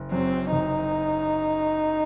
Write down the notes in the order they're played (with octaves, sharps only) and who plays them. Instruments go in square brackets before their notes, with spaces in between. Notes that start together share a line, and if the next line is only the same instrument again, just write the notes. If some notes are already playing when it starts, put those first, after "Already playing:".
Already playing: [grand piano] F#1
[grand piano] F#2 F#3 [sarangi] C4
[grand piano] F#1 [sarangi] D#4